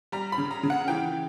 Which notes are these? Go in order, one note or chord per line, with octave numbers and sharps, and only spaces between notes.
G3 A#5
B5
C#3
A#5
C#3
F#5
E3 G5